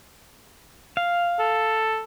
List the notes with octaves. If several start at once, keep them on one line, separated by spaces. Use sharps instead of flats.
F5
A4